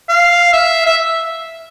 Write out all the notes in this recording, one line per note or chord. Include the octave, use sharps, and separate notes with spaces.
F5
E5
E5